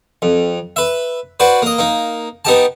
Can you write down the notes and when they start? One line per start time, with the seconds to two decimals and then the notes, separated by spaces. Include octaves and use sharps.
0.22 F2
0.76 B4 E5
1.40 F#4 B4 C5 D5
1.62 A#3 D#5
1.79 A#3 D#4
2.45 B3 D#4 G4 A5